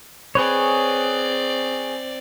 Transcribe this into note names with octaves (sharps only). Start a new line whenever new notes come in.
C4 G#4 B4 C#5 D5